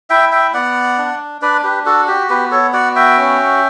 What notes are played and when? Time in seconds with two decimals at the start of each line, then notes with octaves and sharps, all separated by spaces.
0.10 E4 E5 G5
0.32 E5 G5
0.54 B3 D5 F#5
0.98 D4
1.42 D4 B4 D5
1.64 G4 B4
1.86 F#4 A4
2.08 G4
2.29 B3 G4 B4
2.51 A4 C#5
2.73 F#4 D5 F#5
2.96 E5 G5
3.18 C#4